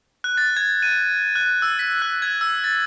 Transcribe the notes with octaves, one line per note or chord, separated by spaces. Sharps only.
F#6
A6
G#6
D#7
F#6
E6
B6
F#6
G#6
E6
A6